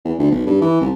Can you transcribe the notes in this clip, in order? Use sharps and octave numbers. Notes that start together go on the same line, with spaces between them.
E2
D2
B1
G2
E3
C2